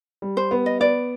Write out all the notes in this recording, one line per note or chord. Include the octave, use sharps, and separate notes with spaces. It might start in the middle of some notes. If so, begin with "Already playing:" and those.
G3
C5
B3
D#5
B3 D5